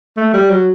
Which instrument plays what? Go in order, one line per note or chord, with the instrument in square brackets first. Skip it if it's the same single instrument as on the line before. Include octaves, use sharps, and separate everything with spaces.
[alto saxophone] A3
G3
F#3